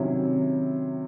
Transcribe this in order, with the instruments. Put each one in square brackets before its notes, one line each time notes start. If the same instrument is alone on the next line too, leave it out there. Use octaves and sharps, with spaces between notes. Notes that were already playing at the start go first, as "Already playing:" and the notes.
Already playing: [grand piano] C3 D#3 F#3 C#4 E4